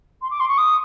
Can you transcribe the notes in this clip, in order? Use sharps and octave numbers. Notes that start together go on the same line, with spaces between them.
C6
D6
C6
C#6
D#6